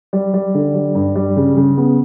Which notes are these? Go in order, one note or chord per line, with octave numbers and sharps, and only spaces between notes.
G3
G3
D3
G3
G2
G3
C#3
C#3
B3